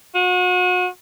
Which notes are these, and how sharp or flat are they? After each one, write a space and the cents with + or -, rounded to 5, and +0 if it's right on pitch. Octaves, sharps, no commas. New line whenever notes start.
F#4 -35